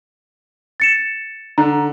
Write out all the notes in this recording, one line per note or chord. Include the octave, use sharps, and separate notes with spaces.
A6 C#7 E7
D3 A#5